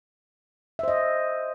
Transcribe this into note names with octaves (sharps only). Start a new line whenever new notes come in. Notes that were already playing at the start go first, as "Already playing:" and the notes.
C5 D#5 E5